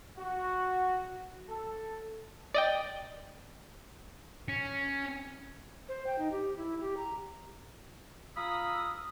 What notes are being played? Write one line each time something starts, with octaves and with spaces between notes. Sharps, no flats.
F#4
A4
D5 D#5 G5
C#4
C5
G5
D#4
G4
E4
G4
A#5
F4 F5 A#5 B5 D#6 E6